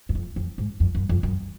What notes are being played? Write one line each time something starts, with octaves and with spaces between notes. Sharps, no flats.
F#2
F2
F2
G#2
F2
F#2
F2
F#2